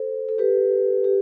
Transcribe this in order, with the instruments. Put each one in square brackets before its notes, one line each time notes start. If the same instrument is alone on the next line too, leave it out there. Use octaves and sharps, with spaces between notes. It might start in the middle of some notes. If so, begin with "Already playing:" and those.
Already playing: [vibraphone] A4 C5
A4
G4 B4
G4